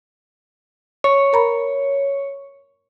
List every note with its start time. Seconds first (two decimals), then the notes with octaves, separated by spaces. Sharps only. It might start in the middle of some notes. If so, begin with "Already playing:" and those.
1.04 C#5 C#6
1.33 A#4 A#5 B5